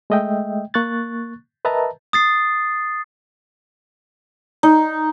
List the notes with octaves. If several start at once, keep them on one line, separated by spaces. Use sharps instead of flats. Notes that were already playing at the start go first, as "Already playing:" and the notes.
G#3 A3 D#5 E5 G5
A#3 C#6 F#6 A6
A#4 B4 D#5 E5 A5 A#5
D#6 A6 C7
D#4